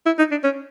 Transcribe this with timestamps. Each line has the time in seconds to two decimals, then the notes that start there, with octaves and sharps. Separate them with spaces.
0.06 E4
0.18 D#4
0.31 D4
0.43 C#4